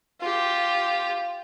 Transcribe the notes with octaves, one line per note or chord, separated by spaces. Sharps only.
F4 G4